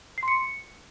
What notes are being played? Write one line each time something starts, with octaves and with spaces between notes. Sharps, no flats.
C7
C6
C#7